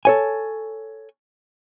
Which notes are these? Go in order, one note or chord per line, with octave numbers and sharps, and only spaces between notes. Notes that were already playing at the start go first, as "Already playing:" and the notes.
A4 C#5 G#5